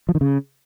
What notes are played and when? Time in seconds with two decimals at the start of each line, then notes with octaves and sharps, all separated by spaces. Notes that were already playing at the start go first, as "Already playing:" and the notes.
0.09 F3
0.15 D#3
0.21 C#3